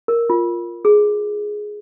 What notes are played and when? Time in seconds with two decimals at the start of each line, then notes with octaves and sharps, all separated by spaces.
0.08 A#4
0.30 F4
0.85 G#4